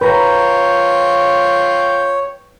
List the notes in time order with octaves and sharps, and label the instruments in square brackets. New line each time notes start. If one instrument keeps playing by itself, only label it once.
[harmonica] F4 G5 [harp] B4 A#5 [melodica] C#5